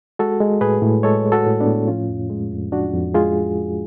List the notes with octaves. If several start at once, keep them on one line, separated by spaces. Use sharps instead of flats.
G#3 F#4 A4
G#3
A2 G#4 B4
A2
G#3 A4 C#5
G#3
F#4 A4
A2
B3 D4
A2
F3 C#4 F4
F2
G#3
F2
F3 D4 F#4
F2
G#3 F4 G#4